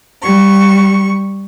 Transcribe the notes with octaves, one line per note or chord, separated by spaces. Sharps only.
G3 C#6